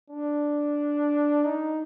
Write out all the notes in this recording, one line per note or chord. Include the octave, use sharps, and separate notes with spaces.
D4
D#4